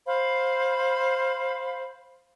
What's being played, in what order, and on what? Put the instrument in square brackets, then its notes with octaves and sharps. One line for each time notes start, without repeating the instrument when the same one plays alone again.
[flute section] C5 F5 B5